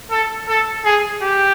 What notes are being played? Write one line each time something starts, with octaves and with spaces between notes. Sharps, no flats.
A4
A4
G#4
G4